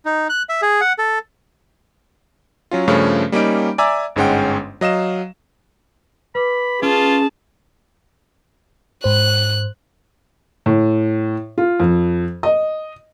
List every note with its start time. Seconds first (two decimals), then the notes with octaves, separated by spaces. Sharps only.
0.05 D#4
0.29 F#6
0.49 E5
0.62 G#4
0.81 F#5
0.99 A4
2.71 F#3 C#4 F4
2.88 G2 C#3 F3 A3 C#4
3.32 G3 A#3 C#4 D#4 D7
3.78 D5 E5 G#5 A#5 D6 E6
4.16 G1 G#2 G#3 C#4 F#5 G5
4.81 F#3 D#5 F5 E7
6.35 B4 B5 D6
6.82 C#4 F4 G#4 A5
9.04 G#2 C5 F#6
10.66 A2
11.58 F4
11.80 F2
12.43 D#5